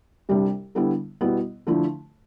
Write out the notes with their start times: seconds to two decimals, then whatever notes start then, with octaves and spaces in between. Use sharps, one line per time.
0.29 C2 C3 G3 D4
0.75 D3 G3 B3 E4
1.21 B2 G3 B3 E4
1.67 D3 F3 A3 E4